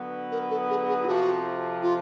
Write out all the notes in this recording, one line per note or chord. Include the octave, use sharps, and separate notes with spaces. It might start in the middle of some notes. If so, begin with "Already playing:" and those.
Already playing: D3 F#3 B3
A#4
A4
G#4
G#4
F4
F2 C3 F3 F#4
F4